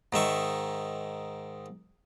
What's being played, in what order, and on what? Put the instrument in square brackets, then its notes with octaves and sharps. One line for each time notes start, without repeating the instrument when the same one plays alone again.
[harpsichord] G#2 D#3 E5 C#6